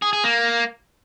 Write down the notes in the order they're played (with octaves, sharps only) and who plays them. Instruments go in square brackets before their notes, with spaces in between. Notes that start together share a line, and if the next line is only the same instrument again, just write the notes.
[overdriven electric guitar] G#4
G#4
A#3